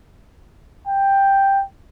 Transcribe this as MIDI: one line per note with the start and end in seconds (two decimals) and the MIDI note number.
0.88 1.63 79